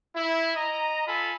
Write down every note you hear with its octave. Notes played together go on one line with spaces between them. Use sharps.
E4
D#5 A#5
F4 A4 G#5 B5